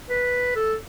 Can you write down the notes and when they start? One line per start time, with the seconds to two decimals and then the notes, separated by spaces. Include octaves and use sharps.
0.10 B4
0.56 A4